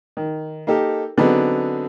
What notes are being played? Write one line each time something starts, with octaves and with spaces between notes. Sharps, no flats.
D#3
A#3 D#4 G4 A4 A#4
D3 F#3 B3 C4 D#4 G#4